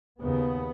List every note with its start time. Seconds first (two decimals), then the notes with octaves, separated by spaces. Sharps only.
0.21 D#2 C#3 B3